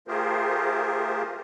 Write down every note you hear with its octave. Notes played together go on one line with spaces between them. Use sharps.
A3 F4 G4 G#4 A#4 C5